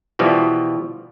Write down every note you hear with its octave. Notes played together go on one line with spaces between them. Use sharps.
B2 E3 F3 G3 B3